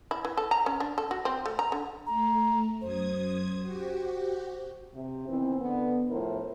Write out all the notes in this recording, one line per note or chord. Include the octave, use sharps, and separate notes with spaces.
E4
E3
A4
A#5
C#4
D4
A4
F#4
C4
A3
A#5
D3
A3 A#5
F#2 C5 D#6 G#6
F#4 G4
C3
D#3 E3 B3 C4
D3 B3
A2 F3 E4 A#4 C5